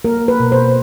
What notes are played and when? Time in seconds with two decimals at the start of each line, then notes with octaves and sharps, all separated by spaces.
0.05 A#3 A#4
0.28 B4
0.40 B2
0.52 C5